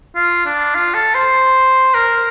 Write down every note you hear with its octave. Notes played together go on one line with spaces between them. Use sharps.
F4
D4
F4
A4
C5
A#4